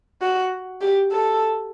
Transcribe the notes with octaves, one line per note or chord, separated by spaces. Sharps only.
F#4
G4
A4